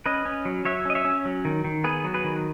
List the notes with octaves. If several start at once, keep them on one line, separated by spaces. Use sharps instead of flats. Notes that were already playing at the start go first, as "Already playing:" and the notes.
C#4 B4 D#5
C#4
F#3
F#3 C#5 E5
C#4 D#5
C#5 E5
C#4
F#3
D#3
D#3
B3 G#4 B4
F#3
G#4 B4
D#3